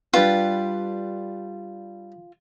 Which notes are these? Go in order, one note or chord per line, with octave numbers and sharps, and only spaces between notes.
G3 D4 F4 B4